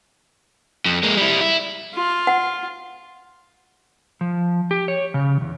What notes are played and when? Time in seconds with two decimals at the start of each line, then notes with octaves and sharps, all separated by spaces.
0.86 F2
1.03 G#3 A#3
1.17 G3 E4
1.41 E4
1.94 F4
2.27 F#5
4.21 F3
4.71 G4
4.88 C#5
5.14 C#3
5.41 E2